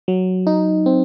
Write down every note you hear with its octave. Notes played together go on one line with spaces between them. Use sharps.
F#3
D#4
C4